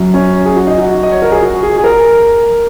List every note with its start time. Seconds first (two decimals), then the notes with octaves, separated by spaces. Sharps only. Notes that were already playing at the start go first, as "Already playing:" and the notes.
Already playing: F#2 F#3
0.14 C#4
0.46 G#4
0.56 F#4
0.67 D#4
0.78 F#4
1.03 D#5
1.12 C#5
1.22 A#4
1.32 G#4
1.42 F#4
1.63 G#4
1.78 G#4
1.84 A#4